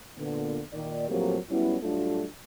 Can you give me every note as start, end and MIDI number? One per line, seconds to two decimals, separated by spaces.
0.18 0.60 46
0.18 0.60 50
0.18 0.60 59
0.73 1.06 46
0.73 1.06 51
0.73 1.06 74
1.08 1.37 45
1.08 1.37 53
1.08 1.37 54
1.08 1.37 58
1.08 1.37 60
1.08 1.37 67
1.50 1.76 54
1.50 1.76 55
1.50 1.76 59
1.50 1.76 61
1.50 1.76 64
1.82 2.25 45
1.82 2.25 54
1.82 2.25 55
1.82 2.25 57
1.82 2.25 62
1.82 2.25 65